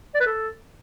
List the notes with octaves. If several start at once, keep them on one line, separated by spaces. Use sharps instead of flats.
D5
B4
A4